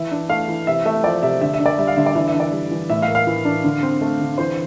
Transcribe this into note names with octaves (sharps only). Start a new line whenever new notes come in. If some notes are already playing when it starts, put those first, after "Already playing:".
Already playing: E3 E5
D4
A3 F5
E3
C3 E5
A3 E5
F3 D5
C3 E5
D3 E5
E5
D4
D5
G3 E5
F5
D3 E5
D5
E3 E5
E5
D4
D5
G3
E3
A2 E5
F5
A#3
F5
E3
D4
D3
C4
A3
D3
E3 C5